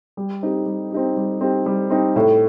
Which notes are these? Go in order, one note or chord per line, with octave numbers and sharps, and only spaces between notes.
G3
C4 D#4 G4
G3
C4 D#4 G4
G3
C4 D#4 G4
G3
C4 D#4 G4
A2